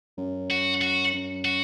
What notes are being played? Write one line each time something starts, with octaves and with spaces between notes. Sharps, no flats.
F#2
F#4
F#4
F#2
F#4